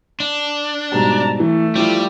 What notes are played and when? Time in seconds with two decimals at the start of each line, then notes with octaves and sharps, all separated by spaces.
0.20 D4
0.92 G#2 B2 G3 A5 A#5
1.40 E3 A3
1.76 F3 G3 E4 F4